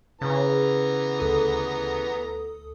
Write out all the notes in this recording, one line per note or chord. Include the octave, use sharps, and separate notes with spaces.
C#3 E3 B3 A#5
D2 A4 D#6